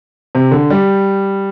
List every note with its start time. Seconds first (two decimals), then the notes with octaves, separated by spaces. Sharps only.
0.35 C3
0.51 D3
0.70 G3